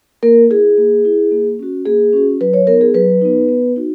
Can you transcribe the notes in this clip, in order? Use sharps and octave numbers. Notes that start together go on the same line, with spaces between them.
A#3 A#4
E4 G#4
A#3
E4
A#3
C#4 F#4
A#3 G#4
C#4 F#4
F#3 B4
C#5
B3 D#4 A#4
G#4
F#3 B4
B3 D#4
B3
D#4 F#4